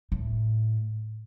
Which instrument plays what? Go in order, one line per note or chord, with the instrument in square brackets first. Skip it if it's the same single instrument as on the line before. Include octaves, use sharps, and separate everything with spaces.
[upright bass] A2